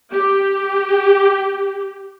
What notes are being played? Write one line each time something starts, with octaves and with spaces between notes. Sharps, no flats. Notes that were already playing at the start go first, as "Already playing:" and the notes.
G4